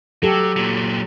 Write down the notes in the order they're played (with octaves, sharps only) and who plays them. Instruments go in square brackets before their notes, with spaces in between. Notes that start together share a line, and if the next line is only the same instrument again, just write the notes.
[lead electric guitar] F#3 [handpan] G4 A4
[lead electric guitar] A#2 F#3